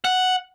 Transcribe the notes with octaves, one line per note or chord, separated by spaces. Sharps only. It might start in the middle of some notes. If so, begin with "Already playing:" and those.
F#5